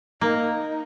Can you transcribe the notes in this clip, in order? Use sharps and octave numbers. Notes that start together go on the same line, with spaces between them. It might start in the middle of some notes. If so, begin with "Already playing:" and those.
A#3 D#4